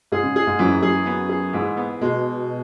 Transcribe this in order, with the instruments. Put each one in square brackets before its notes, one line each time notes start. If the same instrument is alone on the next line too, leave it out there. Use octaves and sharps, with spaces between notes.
[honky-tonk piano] G#2 [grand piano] G#4
[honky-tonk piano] C#3
[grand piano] G#4
[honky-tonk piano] G#2
[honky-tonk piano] F#2 [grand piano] E3
[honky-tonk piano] F#2 [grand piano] G#4
[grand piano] B3
G#4
[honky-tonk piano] G#2 [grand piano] E3
[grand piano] B3
[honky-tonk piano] B2 [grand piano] G#3